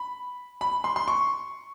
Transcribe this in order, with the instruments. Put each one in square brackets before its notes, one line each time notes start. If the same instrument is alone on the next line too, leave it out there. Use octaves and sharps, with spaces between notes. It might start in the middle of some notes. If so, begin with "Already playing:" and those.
Already playing: [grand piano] B5
B5
C6
C6
C#6